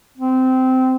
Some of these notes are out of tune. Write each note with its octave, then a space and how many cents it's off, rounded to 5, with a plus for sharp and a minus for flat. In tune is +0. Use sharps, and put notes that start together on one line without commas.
C4 -15